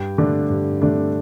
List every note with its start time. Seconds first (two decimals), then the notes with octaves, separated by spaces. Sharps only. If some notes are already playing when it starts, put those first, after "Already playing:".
Already playing: G2 G5
0.18 D3 A3 D4
0.50 G2
0.82 D3 A3 D4